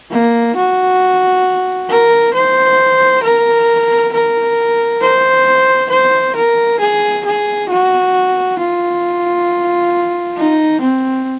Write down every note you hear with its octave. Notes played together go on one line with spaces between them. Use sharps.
A#3
F#4
A#4
C5
A#4
A#4
C5
C5
A#4
G#4
G#4
F#4
F4
D#4
C4